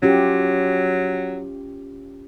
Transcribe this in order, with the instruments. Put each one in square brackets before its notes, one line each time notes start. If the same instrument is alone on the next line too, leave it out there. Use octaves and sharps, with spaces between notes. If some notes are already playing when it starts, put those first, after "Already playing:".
[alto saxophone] F#3 [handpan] C#4 F4 G4